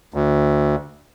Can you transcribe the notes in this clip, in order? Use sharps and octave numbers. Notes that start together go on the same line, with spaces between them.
D2